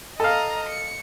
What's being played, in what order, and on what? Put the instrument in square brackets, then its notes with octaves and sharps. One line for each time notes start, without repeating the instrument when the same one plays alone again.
[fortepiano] A4 F5 [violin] D#5 A#5
[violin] C#7